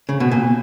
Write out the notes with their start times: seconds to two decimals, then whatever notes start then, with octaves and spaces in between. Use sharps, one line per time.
0.09 C#3
0.20 B2
0.31 A#2